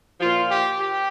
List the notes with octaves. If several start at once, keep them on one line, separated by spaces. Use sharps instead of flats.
A#2 F3 F4
G4
G4